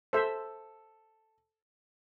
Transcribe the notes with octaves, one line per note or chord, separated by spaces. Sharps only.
A4 C5 E5